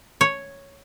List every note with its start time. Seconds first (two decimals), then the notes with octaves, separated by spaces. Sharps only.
0.21 C#5